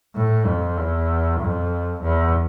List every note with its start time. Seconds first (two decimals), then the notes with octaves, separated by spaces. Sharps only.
0.15 A2
0.46 F2
0.78 E2
1.40 F2
2.02 E2